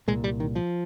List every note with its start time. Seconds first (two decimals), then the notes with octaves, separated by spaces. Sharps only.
0.08 C2 A#2 G#3
0.24 G3
0.40 D#3
0.55 F3